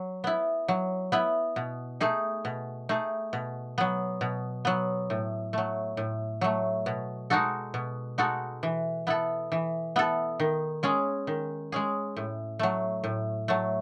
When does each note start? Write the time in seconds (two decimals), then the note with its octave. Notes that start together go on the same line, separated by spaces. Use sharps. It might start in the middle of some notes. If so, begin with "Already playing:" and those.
Already playing: F#3
0.24 B3 E4
0.68 F#3
1.12 B3 E4
1.56 B2
2.00 A3 D#4 G#4
2.45 B2
2.89 A3 D#4 G#4
3.33 B2
3.78 F#3 B3
4.21 B2
4.65 F#3 B3
5.10 A2
5.53 F#3 A3
5.97 A2
6.41 F#3 A3
6.86 B2
7.30 G#3 D#4 F#4 A4
7.74 B2
8.18 G#3 D#4 F#4 A4
8.63 E3
9.07 B3 E4 A4
9.52 E3
9.96 B3 E4 A4
10.40 D#3
10.83 G#3 C#4 G#4
11.27 D#3
11.72 G#3 C#4 G#4
12.17 A2
12.59 F#3 A3
13.04 A2
13.48 F#3 A3